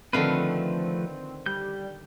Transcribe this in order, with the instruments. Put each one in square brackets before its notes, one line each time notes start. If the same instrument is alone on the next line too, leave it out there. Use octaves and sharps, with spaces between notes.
[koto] D3 D#3 F5 [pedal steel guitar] F3 A3 B4 [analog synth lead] C4
[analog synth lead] G3 [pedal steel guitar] G6